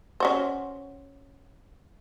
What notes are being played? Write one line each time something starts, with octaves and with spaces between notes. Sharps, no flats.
C#4 F#4 C5